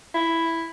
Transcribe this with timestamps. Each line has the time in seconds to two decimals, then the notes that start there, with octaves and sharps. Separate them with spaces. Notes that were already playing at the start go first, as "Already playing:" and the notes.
0.14 E4